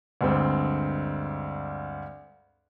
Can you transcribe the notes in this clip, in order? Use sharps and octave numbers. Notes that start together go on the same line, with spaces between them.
D2 G2 G#3 C4